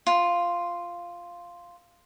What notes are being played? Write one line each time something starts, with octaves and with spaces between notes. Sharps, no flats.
F4